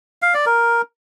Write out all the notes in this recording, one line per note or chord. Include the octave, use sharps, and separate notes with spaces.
F5
D5
A#4